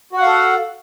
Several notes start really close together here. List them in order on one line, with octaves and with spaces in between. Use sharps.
F#4 F#5 F5 A4